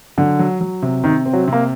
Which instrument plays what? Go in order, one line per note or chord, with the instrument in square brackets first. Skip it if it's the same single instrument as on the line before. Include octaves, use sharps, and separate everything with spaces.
[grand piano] D3 [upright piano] F#3
[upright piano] F#3
F#3
C3
[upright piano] C3 [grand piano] D#3
[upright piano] C4
[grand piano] F#3
[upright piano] C3 [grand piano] A#3